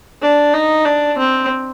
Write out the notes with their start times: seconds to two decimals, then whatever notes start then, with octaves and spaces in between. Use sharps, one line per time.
0.22 D4
0.54 D#4
0.85 D4
1.18 C4